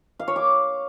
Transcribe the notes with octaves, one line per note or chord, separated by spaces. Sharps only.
F5
C#5
D6